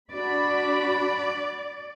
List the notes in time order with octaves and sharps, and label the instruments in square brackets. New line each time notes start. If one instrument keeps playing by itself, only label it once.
[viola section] D4 F#4 B5 [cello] D5